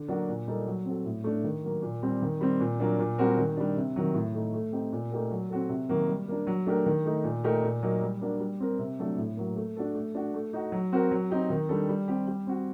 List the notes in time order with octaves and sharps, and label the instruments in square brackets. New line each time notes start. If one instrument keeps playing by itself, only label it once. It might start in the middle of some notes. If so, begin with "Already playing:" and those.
Already playing: [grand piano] D3
F#3 A#3 D4 F#4
A#2
G3 A#3 D#4 A4
F#3
C4 F#4 A4
A2
A3 D4
D#3
F#3 A#3
A#2
G3 C4
D#3
G3 C4
A#2
F#3 A#3 D4
A#2
G3 C4 F#4 A#4
D#3
G3 D4
C3
D#3 F#3
A2
A3 D#4
A3
C4 D#4 G4
A#2
A3 D#4 G4 A#4
F#3
C4 F#4 A4
C3
D#3 F#3 A#3 F#4
G3
A#3 D4
F#3
A3 D4 G4 A#4
D#3
A3 D#4
A#2
A3 D#4 G4 A#4
A#2
F#3 A#3 D#4
G3
A#3 D4 F#4
G3
C4 G4 A#4
C3
F#3 A3 D4 A4
A2
F#3 A#3
A3
D4 F#4 A4
A3
D4 F#4
A3
D#4 F#4
F#3
C4 F#4 A#4
F#3
C4 D#4 G4
D#3
G3 D4 A4
G3
C4 G4
G3
C4 F#4